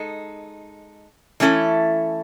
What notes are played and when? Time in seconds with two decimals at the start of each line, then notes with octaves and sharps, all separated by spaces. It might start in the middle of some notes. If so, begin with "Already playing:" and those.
Already playing: G#3 D#4 A4
1.40 E3 A3 C#4 E4 A4